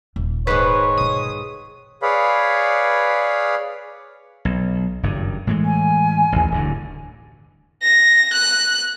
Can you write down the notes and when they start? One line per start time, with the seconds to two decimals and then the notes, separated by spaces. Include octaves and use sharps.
0.16 D#1 F4
0.47 G#2 D#3 G#3 B4 C#5
0.97 B2 F4 D#6
2.02 G#4 B4 C#5 D5 F5 B5
4.45 B1
5.03 F#1 G2 D#3
5.47 A2 E3 G#3
5.65 G#5
6.32 A1 D#2
6.52 D1 G2 D3
7.83 A#6
8.33 F#6